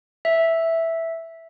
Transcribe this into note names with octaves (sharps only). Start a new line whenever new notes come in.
E5